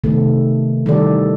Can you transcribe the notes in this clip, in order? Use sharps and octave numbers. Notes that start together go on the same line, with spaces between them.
C3 D#3 A3 B3 A4
D#3 E3 G3 G4 A4 D5